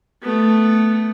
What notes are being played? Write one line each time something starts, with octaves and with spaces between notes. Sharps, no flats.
A3 B3